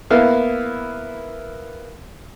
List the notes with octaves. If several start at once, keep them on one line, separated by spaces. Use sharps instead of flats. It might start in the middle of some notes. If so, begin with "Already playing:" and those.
A#3 B3 E4 F5